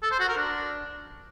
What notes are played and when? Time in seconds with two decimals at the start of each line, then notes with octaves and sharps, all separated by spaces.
0.02 A4
0.11 C5
0.20 F#4
0.28 A#4
0.37 D4